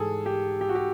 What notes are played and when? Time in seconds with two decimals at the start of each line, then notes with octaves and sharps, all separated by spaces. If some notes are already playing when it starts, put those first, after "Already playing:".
Already playing: G#2 E3 G3 G#4 A4
0.26 G4
0.61 G4
0.69 F#4
0.75 G4